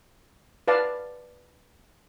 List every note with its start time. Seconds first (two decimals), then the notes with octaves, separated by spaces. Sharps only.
0.68 B4 D5 F5 A5